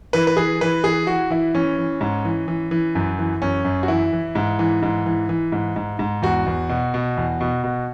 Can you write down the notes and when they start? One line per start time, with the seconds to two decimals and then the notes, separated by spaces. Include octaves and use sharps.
0.13 E3 B4
0.27 B4
0.37 E3 G#4
0.61 E3 B4
0.84 E3 G#4
1.07 E3 F#4
1.30 E3 E4
1.54 E3 C#4
1.78 E3
2.01 G#2
2.25 E3
2.48 E3
2.71 E3
2.95 F#2
3.19 E3
3.42 F#2 C#4
3.65 F#2
3.83 F#4
3.88 E3 E4
4.13 E3
4.35 G#2
4.59 E3
4.82 G#2
5.06 E3
5.29 E3
5.52 G#2
5.76 G#2
5.99 G#2
6.22 E2 F#4
6.46 E2
6.69 B2
6.94 B2
7.17 E2
7.41 B2
7.64 B2